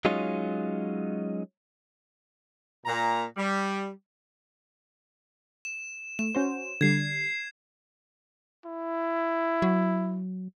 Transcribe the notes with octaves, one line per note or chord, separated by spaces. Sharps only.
F#3 G#3 C#4 D#4 F4
A#2 A#5
G3
E7
A3 E7
C#4 F#4 C5
D3 G3 G#6 C7
E4
F#3